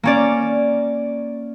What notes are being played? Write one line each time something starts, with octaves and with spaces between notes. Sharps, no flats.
A#3 C#4 D5